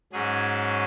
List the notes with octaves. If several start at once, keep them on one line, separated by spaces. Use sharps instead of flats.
G#2 F#3 C#4 G#4